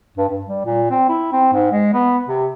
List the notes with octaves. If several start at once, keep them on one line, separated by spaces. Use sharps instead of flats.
G2
G2
G3
A#2
C4
E4
C4
G#2
G#3
B3
C3